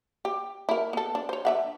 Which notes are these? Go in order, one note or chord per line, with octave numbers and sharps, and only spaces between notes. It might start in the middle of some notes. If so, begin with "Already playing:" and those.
G4
E4 A#4
B3 A4
D4
C5 C#5
D3 E5 F#5